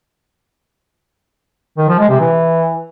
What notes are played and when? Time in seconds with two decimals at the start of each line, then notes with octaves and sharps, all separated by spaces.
1.78 D#3
1.88 F3
1.99 G#3
2.09 C3
2.20 E3